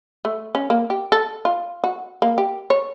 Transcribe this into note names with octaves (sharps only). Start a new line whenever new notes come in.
A3
C#4
A#3
G4
A4
F4
F#4
A#3
G4
C#5